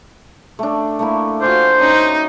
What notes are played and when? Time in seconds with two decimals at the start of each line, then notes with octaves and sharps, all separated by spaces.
0.59 A3 D4
0.99 A3 A#3 E4
1.42 F4 F#4 C5 G#5 D6
1.80 C#4 D#4